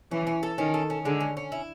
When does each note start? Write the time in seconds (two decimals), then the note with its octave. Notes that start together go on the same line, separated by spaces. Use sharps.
0.11 E3 C#4
0.27 C#4
0.43 A4
0.58 D#3 C#4
0.74 A4
0.90 C#4
1.05 D3 G#3
1.20 C#4
1.37 C#4
1.52 E4